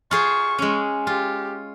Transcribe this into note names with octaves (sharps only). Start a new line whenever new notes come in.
F4 G#4 C5 C#6
G#3 C#4
F4 G4